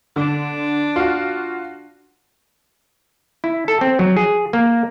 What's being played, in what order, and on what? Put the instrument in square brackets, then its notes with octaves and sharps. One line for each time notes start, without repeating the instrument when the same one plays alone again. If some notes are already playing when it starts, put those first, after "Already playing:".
[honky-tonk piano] D3 [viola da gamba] D4
[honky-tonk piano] F4 F#4
[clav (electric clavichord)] E4
A4
C4
F#3
G#4
A#3